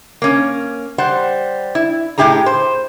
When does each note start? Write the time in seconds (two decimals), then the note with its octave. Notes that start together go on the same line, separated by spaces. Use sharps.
0.22 A#3 C#4
0.98 G3 C5 F#5
1.75 E4
2.18 A2 F3 E4 G4 G#4 A#5
2.46 C5